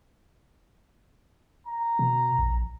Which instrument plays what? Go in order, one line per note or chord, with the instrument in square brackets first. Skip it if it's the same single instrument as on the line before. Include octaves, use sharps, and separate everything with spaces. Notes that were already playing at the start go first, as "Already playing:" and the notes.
[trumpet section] A#5
[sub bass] B2
A#1